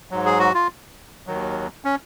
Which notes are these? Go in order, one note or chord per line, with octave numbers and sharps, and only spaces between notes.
G#2 F#3
G#4
F#4
F4
D#2 D#3 F#3
C#4